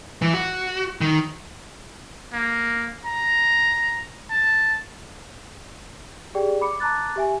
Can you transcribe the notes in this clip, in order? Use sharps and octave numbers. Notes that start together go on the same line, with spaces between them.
E3
F#4
D#3
A#3
A#5
A5
G4 G#4 D5 G5
B5 D6 C#7
A5 A#5 D6 F#6 A6
G4 E5 G#5